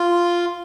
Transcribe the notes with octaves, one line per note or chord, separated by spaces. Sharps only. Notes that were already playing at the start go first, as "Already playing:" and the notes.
Already playing: F4